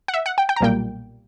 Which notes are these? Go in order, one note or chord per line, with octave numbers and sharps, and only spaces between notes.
F#5
E5
F#5
G5
G5
A#5
B1 A#2 G3 A#3 G5